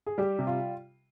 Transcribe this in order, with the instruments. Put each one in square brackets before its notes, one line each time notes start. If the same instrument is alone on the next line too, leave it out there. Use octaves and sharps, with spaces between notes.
[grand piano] G#4
[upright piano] G3 [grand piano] G4
[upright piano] C3
[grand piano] F4